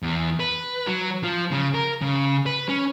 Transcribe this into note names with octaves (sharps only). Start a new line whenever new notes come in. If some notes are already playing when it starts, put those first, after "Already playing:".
E2
B4
F#3
F3
C#3
A#4
C#3
B4
C#4